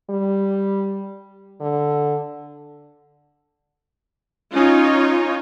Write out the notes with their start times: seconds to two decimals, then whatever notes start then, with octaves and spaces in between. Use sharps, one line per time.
0.10 G3
1.61 D3
4.54 C#4 D#4 F4 C#5